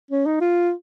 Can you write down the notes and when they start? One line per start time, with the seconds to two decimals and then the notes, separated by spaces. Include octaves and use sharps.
0.11 C#4
0.26 D#4
0.41 F4